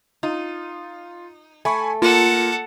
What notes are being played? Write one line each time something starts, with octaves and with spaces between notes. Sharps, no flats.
D#4 F4
A3 G#5 B5 C#6
A#3 F4 A4 F#5